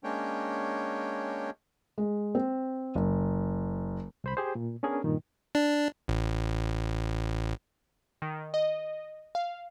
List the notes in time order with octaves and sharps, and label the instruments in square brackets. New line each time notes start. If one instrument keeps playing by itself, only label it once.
[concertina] G#3 A#3 C#4 D4 C#5 G5
[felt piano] G#3
C4
F#1
[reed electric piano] C2 C5 B5
G4 G#4 C5
A#2
B3 C#4 D4 G#4 A#4
G2 A#2 D#3
[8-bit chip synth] D4
A1
[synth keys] D#3
D#5
F5